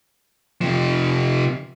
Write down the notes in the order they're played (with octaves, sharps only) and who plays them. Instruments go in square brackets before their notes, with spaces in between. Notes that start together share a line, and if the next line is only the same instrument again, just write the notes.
[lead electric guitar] C3 F3